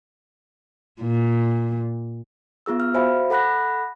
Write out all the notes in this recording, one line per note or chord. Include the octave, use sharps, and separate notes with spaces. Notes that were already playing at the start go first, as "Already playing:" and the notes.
A#2
B3 F4 G#4 E6
F6
F#4 C5 E5 F5 G#5 B5
A4 F#5 B5 F#6 A#6